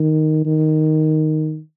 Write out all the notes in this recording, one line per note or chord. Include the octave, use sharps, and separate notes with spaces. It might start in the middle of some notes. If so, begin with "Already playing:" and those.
Already playing: D#3
D#3